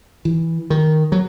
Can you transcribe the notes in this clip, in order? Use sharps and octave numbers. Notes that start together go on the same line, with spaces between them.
E3
D#3
F#3